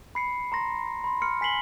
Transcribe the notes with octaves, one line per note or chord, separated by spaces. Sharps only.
B5 C7 C#7
A#5 C6 A#6
B5 C6
C6 F6 C#7
G#5 B6 C7 F#7 G7